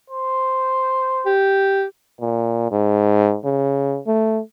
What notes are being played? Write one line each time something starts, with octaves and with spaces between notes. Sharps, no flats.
C5
G4
A#2
G#2
C#3
A3